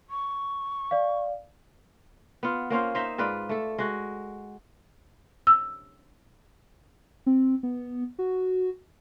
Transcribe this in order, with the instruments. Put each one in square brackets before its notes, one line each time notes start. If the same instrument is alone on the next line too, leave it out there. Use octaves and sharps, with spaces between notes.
[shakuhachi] C#6
[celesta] D5 F5
[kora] B3 F4
A#3 C#4 F4 C5
D#4 C5 D#5 E5
G#2 F4 B4 D5
A3 A4
G#3 F#4
[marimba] E6
[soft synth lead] C4
B3
F#4